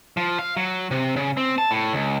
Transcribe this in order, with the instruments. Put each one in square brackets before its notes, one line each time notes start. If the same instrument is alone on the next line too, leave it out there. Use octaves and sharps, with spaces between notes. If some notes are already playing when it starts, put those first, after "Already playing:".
[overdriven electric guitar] F3
F5
F#3
C3
C#3
C4
A5
A2
C#2